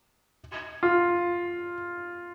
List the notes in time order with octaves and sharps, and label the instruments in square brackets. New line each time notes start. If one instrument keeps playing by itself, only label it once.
[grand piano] F4